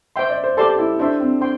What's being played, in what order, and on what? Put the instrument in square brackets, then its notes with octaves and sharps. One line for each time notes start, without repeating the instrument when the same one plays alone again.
[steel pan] C5 G5 C6 [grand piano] E5
[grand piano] D5
C5
[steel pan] G4 D5 A5 C6 [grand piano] A4
[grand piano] E4
[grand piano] D4 [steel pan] A4 C5 E5 C6
[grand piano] C4
[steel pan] C5 G5 C6